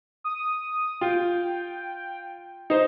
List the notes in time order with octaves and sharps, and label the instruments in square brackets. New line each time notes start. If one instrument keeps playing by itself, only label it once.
[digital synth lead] D#6
[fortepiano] F4 [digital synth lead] G5
[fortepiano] D#4 C5